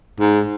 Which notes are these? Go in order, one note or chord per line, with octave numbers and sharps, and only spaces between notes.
G#2